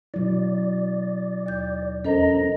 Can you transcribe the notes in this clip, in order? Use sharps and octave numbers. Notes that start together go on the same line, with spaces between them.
B2 F#3 E4 D5
D#2 G6
E2 C#4 A4 A#4 C5 D#5 A#5